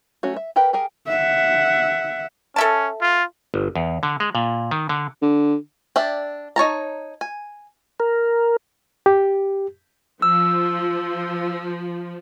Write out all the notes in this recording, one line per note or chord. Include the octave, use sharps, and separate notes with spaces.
F#3 A3 C#4 F#4
E5
G4 A#4 B4 G5
G4 G#4 A#4 G#5
E5 F#5
C#4 A4 E5 A5
F4
G1
E2
D3
G#3
A#2
D#3
D3
D3
D4 D5 E5 G5
D#4 C#5 A5 A#5
G#5
A#4
G4
F3 E6